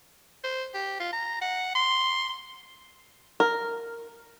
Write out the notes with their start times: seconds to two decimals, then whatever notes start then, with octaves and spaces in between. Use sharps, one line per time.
0.44 C5
0.74 G4
1.00 F4
1.13 A#5
1.42 F#5
1.75 C6
3.40 A#4